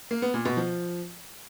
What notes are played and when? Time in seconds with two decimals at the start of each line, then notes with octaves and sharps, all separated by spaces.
0.11 A#3
0.22 B3
0.34 A#2
0.45 B2
0.57 F3